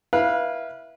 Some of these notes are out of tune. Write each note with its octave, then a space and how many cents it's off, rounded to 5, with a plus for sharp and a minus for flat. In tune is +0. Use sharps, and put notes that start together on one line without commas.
E4 -5 B4 -25 F5 +0